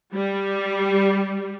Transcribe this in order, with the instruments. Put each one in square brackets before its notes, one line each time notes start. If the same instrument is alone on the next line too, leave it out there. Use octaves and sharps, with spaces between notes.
[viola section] G3